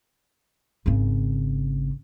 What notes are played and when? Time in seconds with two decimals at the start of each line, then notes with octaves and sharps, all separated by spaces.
0.86 G#1 C#3